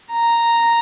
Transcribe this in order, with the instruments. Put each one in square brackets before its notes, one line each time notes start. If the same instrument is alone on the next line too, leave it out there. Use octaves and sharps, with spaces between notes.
[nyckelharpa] A#5